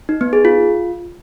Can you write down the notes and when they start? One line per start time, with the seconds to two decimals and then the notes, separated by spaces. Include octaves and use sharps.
0.09 D#4
0.21 B3
0.33 G#4
0.45 F4